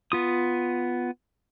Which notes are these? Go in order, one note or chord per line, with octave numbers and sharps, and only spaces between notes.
B3 F4 D#6